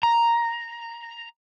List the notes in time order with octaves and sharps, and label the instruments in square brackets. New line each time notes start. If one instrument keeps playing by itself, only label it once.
[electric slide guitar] A#5